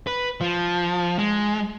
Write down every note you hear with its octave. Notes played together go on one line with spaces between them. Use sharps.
B4
F3
G#3